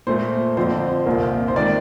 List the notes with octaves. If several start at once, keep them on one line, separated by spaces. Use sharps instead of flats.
A#2 A3 C5
F2 D3 F3 C5
C2 A#2 F3 A#3
C5
D#3 A3 D5